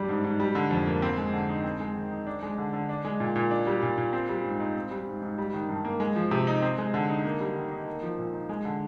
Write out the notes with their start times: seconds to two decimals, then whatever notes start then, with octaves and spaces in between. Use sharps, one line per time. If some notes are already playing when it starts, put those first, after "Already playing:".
Already playing: G2 G3 D4
0.09 G#2
0.24 G#2
0.40 G3
0.55 D3
0.71 F2
0.87 A#3
1.02 C4
1.18 G#3
1.33 D3
1.49 D#4
1.64 C4
1.80 G#3
1.95 D#3
2.11 D#4
2.27 D4
2.42 G#3
2.58 D3
2.73 D3
2.89 D4
3.05 G#3
3.20 A#2
3.36 A#2
3.51 D4
3.67 G3
3.82 A#2
3.98 A#2
4.13 C4
4.29 G3
4.44 G#2
4.60 D#4
4.76 C4
4.91 G3
5.07 G#2
5.22 G#2
5.38 G3
5.54 D#3
5.69 G2
5.85 A#3
6.00 G#3
6.16 F3
6.31 C3
6.47 D#4
6.62 C4
6.78 G#3
6.94 D3
7.10 D#4
7.25 A#3
7.40 G3
7.56 D#3
7.71 D#4
7.87 A#3
8.03 F3
8.18 A#2
8.33 D#4
8.49 G#3
8.65 D3